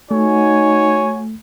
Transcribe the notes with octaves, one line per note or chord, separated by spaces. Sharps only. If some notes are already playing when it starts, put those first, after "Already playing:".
A3 D#4 F#4 C#5 G#5